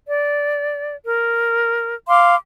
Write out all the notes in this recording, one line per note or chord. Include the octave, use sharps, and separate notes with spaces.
D5
A#4
F5 C6 D6